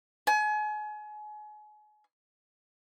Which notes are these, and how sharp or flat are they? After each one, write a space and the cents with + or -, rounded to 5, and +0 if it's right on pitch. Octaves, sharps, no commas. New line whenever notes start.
G#5 +35